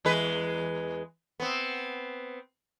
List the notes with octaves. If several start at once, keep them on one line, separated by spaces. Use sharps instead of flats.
E2 G#3 B4
B3 C4